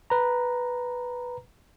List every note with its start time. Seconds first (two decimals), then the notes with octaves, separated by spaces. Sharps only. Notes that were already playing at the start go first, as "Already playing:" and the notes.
0.10 B4 A#5